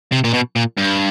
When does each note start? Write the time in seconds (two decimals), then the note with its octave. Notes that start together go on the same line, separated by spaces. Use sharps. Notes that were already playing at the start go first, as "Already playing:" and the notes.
0.12 C3
0.24 A#2
0.33 B2
0.56 A#2
0.78 G2